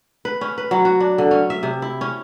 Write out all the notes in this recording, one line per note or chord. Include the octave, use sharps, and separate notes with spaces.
B4
C#4
B4
F#3
F#4
D4
D3
C#4
E5
C3
E4
C#4